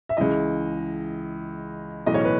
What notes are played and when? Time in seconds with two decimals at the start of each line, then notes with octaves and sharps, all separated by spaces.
0.09 E5
0.17 C#2 C#3 E3 D#5
2.06 B1 A2 E3 D#5
2.14 C#5
2.24 B4